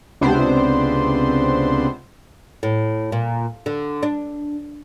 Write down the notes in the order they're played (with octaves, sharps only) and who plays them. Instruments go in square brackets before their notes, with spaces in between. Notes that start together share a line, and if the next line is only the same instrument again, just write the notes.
[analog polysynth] C#2 C3 B3 C4 D4 C5
[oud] A2
A#2
D3
D4